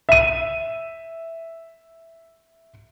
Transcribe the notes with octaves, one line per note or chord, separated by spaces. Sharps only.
E5 D#7